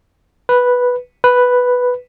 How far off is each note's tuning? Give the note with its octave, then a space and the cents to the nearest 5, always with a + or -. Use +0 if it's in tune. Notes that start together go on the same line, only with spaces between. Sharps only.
B4 -5
B4 +0